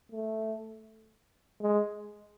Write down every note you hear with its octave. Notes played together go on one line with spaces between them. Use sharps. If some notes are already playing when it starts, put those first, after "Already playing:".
A3
G#3